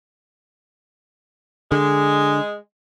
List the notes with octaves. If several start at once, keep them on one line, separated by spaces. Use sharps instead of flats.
D3 G#3